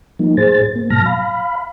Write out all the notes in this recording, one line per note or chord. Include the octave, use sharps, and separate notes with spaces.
F3 F#3 A#3 D#4
A2 G#4 C5 A6
A#3
G#2 B2 F#3 A5 F6 A#6
F5 B5